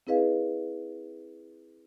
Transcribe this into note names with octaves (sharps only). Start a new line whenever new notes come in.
C4 E4 G#4 B4 D#5 F5